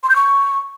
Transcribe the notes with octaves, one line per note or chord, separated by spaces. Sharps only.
C6
G6
C#6